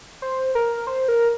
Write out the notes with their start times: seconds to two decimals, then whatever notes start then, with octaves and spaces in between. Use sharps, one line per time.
0.22 C5
0.55 A#4
0.87 C5
1.08 A#4